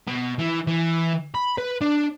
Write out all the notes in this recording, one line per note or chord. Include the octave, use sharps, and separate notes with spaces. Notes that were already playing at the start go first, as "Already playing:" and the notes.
B2
E3
E3
B5
B4
D4